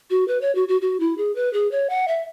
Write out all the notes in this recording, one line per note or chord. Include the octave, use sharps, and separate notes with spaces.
F#4
B4
C#5
F#4
F#4
F#4
E4
G#4
B4
G#4
C#5
F#5
E5